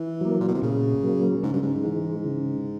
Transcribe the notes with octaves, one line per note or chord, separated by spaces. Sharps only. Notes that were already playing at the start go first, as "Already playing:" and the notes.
Already playing: E3
F#3 A#3
A#2
B2
C3
A#2 C#3
F#3 A#3
G#2 C#3
G2
G#2
E3 G#3
C#3